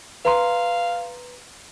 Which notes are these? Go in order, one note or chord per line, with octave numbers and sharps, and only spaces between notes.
B4 F5 A#5 C6